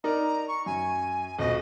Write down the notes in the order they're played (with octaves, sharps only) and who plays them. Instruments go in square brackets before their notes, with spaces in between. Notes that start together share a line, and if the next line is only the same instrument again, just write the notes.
[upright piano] D#4 A#4 D5 [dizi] A#5
[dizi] C#6
[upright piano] F#2 [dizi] G#5
[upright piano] D#1 B2 [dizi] D#5